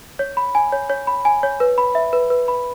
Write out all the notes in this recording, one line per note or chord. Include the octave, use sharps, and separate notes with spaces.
C#5
B5
G#5
C#5
C#5
B5
G#5
C#5
B4
B5
E5
B4
B4
B5